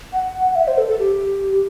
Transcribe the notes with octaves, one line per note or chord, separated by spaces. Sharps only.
F#5
E5
C5
A4
A4
G4